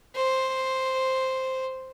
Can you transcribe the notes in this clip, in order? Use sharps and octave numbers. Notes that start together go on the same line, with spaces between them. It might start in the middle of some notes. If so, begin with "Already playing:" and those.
C5